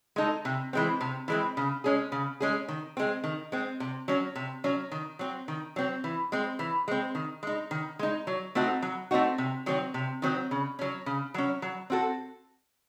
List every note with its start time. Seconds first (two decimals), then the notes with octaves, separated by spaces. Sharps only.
0.16 G#3 D#4 A4
0.45 C3
0.73 E3 G#3 C4
1.01 C3
1.28 E3 G#3 C4
1.57 C#3
1.84 G#3 C#4 G#4
2.12 C#3
2.40 G#3 C#4 G#4
2.68 D#3
2.97 G#3 C4
3.24 D#3
3.52 G#3 C4
3.80 C3
4.08 F#3 C#4
4.36 C3
4.64 F#3 C#4
4.91 D#3
5.19 F#3 C4
5.48 D#3
5.76 F#3 C4
6.04 E3
6.32 G#3 C4
6.59 E3
6.88 G#3 C4
7.15 D#3
7.43 G#3 D#4
7.71 D#3
7.99 G#3 D#4
8.27 F#3
8.55 A3 C4 D#4 F#4
8.82 F#3
9.11 A3 C4 D#4 F#4
9.38 C3
9.66 D#3 F#3 C4
9.94 C3
10.22 D#3 F#3 C4
10.51 C#3
10.79 F#3 C#4
11.06 C#3
11.34 F#3 C#4
11.62 F#3
11.90 C4 F#4 A4